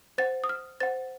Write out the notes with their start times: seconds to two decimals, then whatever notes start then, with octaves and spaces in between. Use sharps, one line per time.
0.18 C5 F#5 A6
0.44 D#6
0.49 F6
0.80 C5 F#5 A6